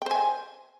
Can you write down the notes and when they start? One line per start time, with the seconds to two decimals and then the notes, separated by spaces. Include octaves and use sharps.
0.02 G5
0.06 C5
0.11 G#5